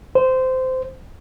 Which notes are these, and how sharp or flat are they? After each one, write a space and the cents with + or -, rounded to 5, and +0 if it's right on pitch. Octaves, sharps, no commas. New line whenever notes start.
C5 -15